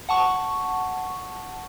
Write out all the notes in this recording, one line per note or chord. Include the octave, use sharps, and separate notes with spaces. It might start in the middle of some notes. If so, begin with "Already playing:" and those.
F#5 A5 C#6